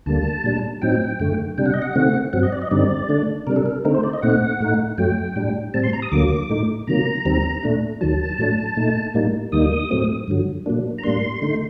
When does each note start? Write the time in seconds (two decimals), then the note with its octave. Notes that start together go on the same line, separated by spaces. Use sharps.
0.06 D2 D3 G3 A#3 A5
0.44 A#2 G3 D4
0.82 A2 F#3 C4 D#4 G5
1.20 F#2 D3 A3
1.58 C3 G3 D4 G5
1.66 F#5
1.74 D#5
1.82 F#5
1.96 C3 D#3 A3 C4
2.33 G2 F#3 C4 F#5
2.43 D#5
2.52 D5
2.62 D#5
2.71 G2 D3 G3 C4 D#4 D5
3.09 D3 A3 D4
3.47 C3 G3 D4 A#4
3.56 A4
3.66 A#4
3.85 D3 A3 C4 D#4 A#4
3.94 C5
4.03 D5
4.13 D#5
4.22 A#2 A3 C4 D#4 F#5
4.60 A2 A3 D#4
4.98 F#2 F#3 A3 G5
5.36 A2 G3 D4
5.74 A2 G3 C4 A5
5.83 C6
5.93 A#5
6.02 D#6
6.12 D2 D3 F#3 A#3 D6
6.50 A2 A3 D#4
6.87 C3 D#3 F#3 A#3 A#5
7.25 D#2 D#3 G3 C4
7.63 A#2 A3 D4
8.01 D#2 D#3 F#3 A5
8.39 A2 F#3 A3 D4
8.77 A#2 A3 D#4
9.14 A2 G3 A#3 D#4
9.52 D#2 D#3 G3 A#3 D#4 D#6
9.90 A2 F#3 A3 C4
10.28 G2 D3 F#3
10.66 A#2 F#3 A#3 D4
10.98 A#5
11.04 A2 G3 A#3 D4 C6
11.42 D3 A3 D#4